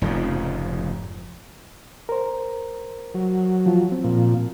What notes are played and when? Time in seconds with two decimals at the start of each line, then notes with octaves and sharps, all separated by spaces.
0.02 F1 G#2 C#3 F3
2.09 A#4 C5
3.14 F#3
3.66 F3 F4
3.92 C4
4.04 A#2 F3